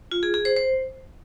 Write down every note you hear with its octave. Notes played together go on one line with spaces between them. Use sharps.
F4
G#4
G#4
C5
C5